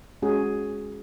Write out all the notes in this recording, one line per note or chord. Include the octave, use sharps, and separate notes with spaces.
G#3 C#4 F#4 G#4